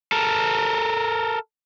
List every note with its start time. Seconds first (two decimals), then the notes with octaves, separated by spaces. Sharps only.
0.12 A4 A#4